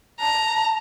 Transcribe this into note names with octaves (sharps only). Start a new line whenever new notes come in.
A5 A#5